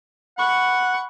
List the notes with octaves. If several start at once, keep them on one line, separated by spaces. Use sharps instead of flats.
F#5 B5 C#6